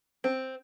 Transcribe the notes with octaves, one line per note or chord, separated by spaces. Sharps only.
C4